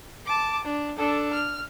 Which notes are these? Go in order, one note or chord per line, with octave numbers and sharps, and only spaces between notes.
A5 D6
D4
D4 A4
F6